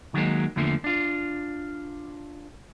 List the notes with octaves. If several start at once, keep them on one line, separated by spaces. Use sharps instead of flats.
D#3 F#3 G#3 A#3
E2 D3 F3 A3 A#3
D4 F4